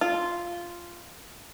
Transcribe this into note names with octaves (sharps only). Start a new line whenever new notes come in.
F4